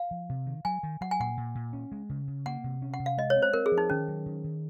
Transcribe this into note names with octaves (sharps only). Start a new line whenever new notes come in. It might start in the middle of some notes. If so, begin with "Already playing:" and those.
Already playing: F5
F3
C3
D#3
F#3 G#5
D#3
F#3 F#5
G#5
A#2 F#5
A#2
A#2
C#4
G#3
C#3
C#3
A#3 F#5
C3
C#4
F#5
C3
F5
G#3 D#5
C#5
C4
C5
C4 A#4
G#4
F3
D#4
D#3 C#4
F#3
D#3
D#3